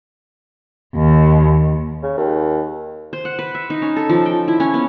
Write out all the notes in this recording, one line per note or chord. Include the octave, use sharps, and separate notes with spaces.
D#2
C#3
D#2
C5
F#5
B4
E5
D#4
C#4
A4
F3
G5
E4
C#4
B3